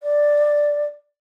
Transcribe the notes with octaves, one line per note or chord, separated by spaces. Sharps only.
D5